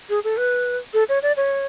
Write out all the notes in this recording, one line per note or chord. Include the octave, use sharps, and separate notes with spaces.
G#4
A4
B4
A4
C#5
D5
C#5